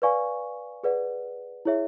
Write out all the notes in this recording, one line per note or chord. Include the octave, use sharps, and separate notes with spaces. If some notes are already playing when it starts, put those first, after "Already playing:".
B4 D5 F5 G#5 C#6
G#4 B4 D5 F#5
E4 G#4 C#5 E5